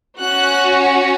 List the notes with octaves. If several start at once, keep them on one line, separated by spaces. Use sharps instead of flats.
C#4 F#4 F#6